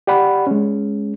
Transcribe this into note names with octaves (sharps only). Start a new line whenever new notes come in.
G4 D5 F#5 B5
G#3 C#4